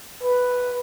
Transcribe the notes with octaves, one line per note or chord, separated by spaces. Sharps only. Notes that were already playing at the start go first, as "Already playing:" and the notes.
B4